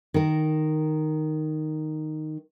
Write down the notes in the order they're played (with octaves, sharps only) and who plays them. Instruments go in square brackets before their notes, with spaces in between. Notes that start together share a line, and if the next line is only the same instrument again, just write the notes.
[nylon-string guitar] D#3 A#4